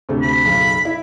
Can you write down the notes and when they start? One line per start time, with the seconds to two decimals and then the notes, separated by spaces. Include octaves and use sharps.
0.09 D2 C3 A3
0.22 B5
0.45 B1 F#2 C#3
0.85 E4